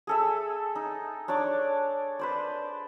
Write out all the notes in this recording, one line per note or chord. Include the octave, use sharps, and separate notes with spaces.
G#4 A4 E5
D#4
D4 C#5 D5 D6
B4 C5 D5